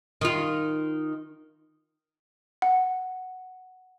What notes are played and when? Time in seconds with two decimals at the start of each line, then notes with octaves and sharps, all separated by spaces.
0.21 D#3 F4
2.62 F#5